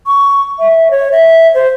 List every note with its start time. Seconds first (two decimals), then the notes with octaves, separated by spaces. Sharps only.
0.07 C#6
0.59 E5
0.91 C#5
1.12 E5
1.55 C5